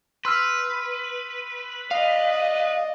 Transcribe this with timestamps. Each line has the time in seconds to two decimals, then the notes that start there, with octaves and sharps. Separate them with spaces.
0.25 B4 C6 E6 F6
1.91 D5 D#5 F5